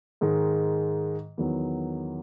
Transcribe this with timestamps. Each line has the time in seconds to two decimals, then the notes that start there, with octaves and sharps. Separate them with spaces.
0.21 G#2 D#3 G#3
1.38 E2 D#3 F#3